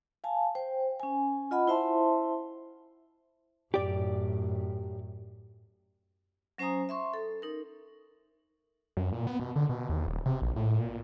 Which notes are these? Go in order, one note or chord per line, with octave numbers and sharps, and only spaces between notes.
F5 G#5 A5
C5 G5
C#4 G#5
F4 D#5 F#5 B5
E4 C5 E5 A5 C6
F#2 A2 G4 D5
F#3 C#4 C5 G#5 A#5 D#6
E5 C6 C#6
A4
D#4 A#4
F#2
A#2
B3
B2
D3
B2
D#2
D#1
C3
A#1
A2
A#2